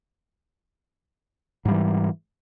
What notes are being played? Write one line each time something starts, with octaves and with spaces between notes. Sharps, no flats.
G#2 E3 G3